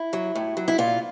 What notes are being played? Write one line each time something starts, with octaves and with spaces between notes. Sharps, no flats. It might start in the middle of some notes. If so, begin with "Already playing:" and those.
Already playing: E4
F#3
A2
F#3
E4
A#2 F4